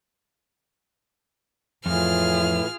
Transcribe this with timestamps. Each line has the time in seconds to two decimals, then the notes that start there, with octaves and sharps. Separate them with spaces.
1.86 F2 A2 E3 F4 G#4 F6